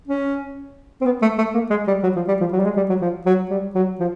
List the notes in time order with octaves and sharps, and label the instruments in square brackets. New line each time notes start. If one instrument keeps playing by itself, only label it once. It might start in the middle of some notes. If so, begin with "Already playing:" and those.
[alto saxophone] C#4
C4
B3
A3
A3
A#3
G#3
G3
F#3
F3
G3
F3
F#3
G3
G#3
G3
F#3
F3
F#3
G3
F#3
F3